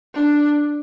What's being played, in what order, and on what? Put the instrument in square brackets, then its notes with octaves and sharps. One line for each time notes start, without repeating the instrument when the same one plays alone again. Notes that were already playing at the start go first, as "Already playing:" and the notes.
[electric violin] D4